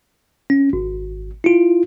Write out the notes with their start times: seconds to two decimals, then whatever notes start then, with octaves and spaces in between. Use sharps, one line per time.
0.50 C#4
0.73 G#1
1.44 E4 F4